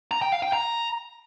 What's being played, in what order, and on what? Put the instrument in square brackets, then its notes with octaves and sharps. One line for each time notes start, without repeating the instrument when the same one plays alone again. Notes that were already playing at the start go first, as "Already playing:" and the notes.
[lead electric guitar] A#5
G5
F5
G5
A#5